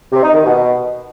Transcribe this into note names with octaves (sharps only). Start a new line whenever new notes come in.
C3
D#4
D#3
B2